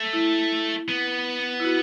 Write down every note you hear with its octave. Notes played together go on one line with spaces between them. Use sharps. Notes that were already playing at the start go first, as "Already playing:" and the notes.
Already playing: A3
E4
B3
E4
F#4